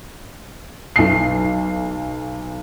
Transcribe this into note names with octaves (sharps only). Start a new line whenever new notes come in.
B1 C7